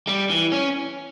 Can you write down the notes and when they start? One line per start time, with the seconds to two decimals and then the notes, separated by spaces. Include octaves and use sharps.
0.08 G3
0.31 E3
0.53 C#4